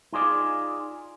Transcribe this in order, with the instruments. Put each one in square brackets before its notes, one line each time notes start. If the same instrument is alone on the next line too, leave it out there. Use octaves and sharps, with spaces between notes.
[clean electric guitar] D#4 F4 G#4 D5